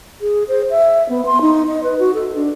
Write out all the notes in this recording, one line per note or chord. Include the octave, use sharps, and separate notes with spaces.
G#4
C5
E5
B3
C6
D#4
D#5
B4
F#4
A4
D4